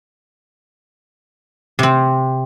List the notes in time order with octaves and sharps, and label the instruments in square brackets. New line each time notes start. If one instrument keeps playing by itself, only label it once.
[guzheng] C3 C4